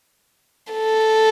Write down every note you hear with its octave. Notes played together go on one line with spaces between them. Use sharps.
A4